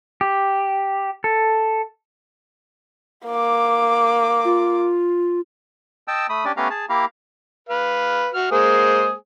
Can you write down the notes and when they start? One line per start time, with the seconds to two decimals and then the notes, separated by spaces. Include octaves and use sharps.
0.21 G4
1.24 A4
3.27 A#3 D6
4.45 F4
6.08 D#5 G5 A5 E6
6.29 A3 B5 D#6
6.45 C#4 D4 G4 D5
6.57 A3 B3 C#4 G4 F5 A#5
6.70 G#4 A5
6.89 A#3 E4 G4 F5 A#5
7.69 B4 F5
8.34 F#4 F6
8.51 G#3 A#3 G#4 C5